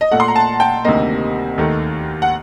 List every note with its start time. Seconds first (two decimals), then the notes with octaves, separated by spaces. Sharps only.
0.01 D#5
0.11 A#2 A3 F#5
0.20 C6
0.28 A#5
0.36 A5
0.60 G5
0.85 D2 C3 D#3 G3 A#3 D#5
1.58 D#2 D#3 A3
2.22 F#5